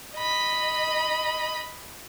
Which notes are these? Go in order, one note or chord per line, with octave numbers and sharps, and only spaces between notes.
D#5 B5